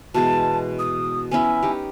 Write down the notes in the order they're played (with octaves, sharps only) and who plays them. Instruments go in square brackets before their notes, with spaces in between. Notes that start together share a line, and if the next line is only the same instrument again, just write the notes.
[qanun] B2 E3 G#3 [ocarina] A5
[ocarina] D#6
[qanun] B3 C#4 E4 [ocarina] G#5
[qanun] D#4 G4